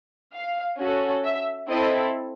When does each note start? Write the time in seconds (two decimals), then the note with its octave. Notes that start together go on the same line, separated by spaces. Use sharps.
0.34 F5
0.79 C#4 F#4 A4
1.24 E5
1.69 C4 E4 A4 D#5